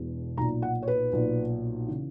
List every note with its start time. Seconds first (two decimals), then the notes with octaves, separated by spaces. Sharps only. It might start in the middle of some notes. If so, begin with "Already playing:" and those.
Already playing: E1 E2 B2
0.37 B1 A#5
0.41 A#2
0.62 F#5
0.82 C#5
0.88 B4
1.13 B1 A#2
1.88 C#3 E3